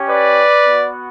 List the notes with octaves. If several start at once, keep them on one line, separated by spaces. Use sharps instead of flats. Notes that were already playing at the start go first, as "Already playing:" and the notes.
Already playing: C#4 G4
B4 D5
B3 F#4